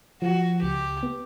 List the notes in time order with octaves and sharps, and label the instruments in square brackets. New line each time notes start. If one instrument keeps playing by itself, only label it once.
[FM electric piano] F3 [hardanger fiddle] F#4
[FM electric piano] C#2 [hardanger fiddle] G4
[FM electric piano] B3